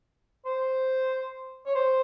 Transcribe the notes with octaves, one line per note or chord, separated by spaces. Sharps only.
C5
C#5
C5